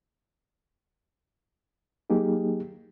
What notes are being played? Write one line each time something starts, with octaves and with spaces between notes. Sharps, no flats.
F#3 A#3 D#4 G4 G#4